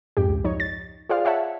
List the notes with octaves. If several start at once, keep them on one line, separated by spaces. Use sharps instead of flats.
F2 G#2 G4
C#2
F3 D#4 C#5
A6
F4 G#4 C5 D5 F5
C#5 E5 F#5 A5